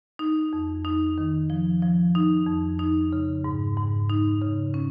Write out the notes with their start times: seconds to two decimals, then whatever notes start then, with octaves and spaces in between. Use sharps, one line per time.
0.19 D#4
0.53 F2
0.85 D#4
1.18 D#3
1.50 F3
1.82 F3
2.15 D#4
2.47 F2
2.79 D#4
3.13 C#3
3.44 G#2
3.77 G#2
4.10 D#4
4.42 C#3
4.74 C#4